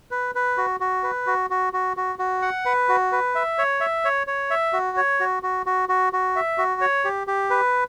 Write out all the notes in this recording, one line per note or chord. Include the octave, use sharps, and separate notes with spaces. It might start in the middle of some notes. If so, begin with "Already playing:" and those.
B4
B4
F#4
F#4
B4
F#4
F#4
F#4
F#4
F#4
F#5
B4
F#4
B4
E5
C#5
E5
C#5
C#5
E5
F#4
C#5
F#4
F#4
F#4
F#4
F#4
E5
F#4
C#5
G4
G4
B4